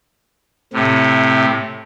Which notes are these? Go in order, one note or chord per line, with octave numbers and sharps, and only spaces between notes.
A2 C3